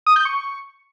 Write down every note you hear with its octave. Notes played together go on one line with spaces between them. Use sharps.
D#6
G6
C#6